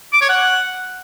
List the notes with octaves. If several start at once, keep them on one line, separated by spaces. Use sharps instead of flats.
D6
C#5
F#5